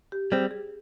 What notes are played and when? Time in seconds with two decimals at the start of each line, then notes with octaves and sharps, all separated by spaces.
0.12 G4
0.32 G3 C4 G#4
0.51 G#4